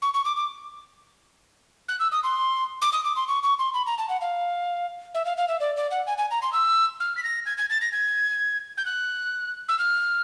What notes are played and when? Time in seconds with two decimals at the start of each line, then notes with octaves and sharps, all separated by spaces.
0.02 C#6
0.14 C#6
0.25 D6
0.36 D6
1.89 F#6
2.00 E6
2.12 D#6
2.23 C6
2.82 D6
2.93 D#6
3.04 D6
3.16 C6
3.28 C#6
3.43 C#6
3.59 C6
3.74 B5
3.87 A#5
3.98 A5
4.09 F#5
4.21 F5
5.14 E5
5.25 F5
5.37 F5
5.48 E5
5.60 D5
5.76 D5
5.91 F#5
6.07 G#5
6.18 G#5
6.31 A#5
6.42 C6
6.53 E6
7.00 F6
7.17 B6
7.23 A#6
7.46 G#6
7.58 G#6
7.70 A6
7.81 A#6
7.92 G#6
8.77 G6
8.85 F#6
9.69 E6
9.79 F6